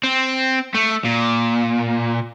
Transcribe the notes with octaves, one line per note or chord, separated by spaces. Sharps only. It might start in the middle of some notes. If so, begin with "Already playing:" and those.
C4
A3
A#2